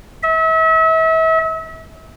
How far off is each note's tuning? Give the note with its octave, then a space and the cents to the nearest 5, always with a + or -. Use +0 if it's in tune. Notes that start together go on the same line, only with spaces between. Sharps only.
E5 -35